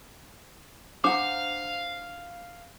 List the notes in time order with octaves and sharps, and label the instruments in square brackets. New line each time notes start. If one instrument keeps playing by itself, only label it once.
[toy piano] D4 D6 [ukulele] C5 F#5 A#5 [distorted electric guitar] F5